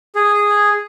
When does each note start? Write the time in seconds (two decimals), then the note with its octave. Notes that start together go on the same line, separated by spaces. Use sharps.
0.15 G#4